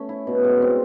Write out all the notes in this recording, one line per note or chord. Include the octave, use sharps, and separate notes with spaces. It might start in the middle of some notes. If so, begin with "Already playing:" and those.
Already playing: A3 C#4
E4
B2
G#3
C4